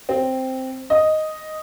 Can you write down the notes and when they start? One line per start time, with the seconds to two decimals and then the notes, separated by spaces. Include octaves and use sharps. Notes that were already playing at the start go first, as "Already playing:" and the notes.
0.09 C4
0.90 D#5